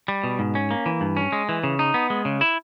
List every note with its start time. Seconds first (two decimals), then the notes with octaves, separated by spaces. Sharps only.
0.08 G3
0.24 B2
0.39 G#2
0.55 C#4
0.71 A#3
0.86 E3
1.01 G2
1.17 C#4
1.32 G#3
1.49 E3
1.63 C#3
1.79 D#4
1.94 B3
2.10 G#3
2.25 C#3
2.41 E4